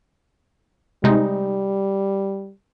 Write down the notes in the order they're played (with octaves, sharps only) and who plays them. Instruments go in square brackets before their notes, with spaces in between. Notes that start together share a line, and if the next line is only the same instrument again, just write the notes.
[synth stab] C3 G#3 D#4 [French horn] G3